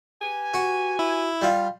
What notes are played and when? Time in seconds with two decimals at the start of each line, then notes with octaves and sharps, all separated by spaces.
0.22 G4 B4 G#5
0.54 F#4
0.99 E4
1.42 G3 F4